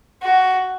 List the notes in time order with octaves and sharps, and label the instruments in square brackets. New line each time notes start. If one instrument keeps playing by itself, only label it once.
[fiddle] F#4